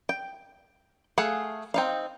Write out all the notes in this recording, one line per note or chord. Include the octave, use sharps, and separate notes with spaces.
G5
A3 G#4 F5 F#5
C4 D#4 F5